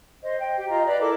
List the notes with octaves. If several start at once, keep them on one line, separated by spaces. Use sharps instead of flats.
C5 D#5
G5
G4
F4 D#5 A#5
B4 D5
E4 A4 A#4 D6